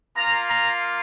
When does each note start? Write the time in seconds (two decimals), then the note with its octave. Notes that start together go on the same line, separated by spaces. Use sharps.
0.16 A#3 F4 A#5
0.49 A#5